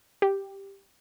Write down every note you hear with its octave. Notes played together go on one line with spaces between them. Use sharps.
G4